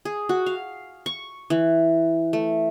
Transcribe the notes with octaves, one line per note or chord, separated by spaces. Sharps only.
G#4
F#4
F5
C#6
E3
A3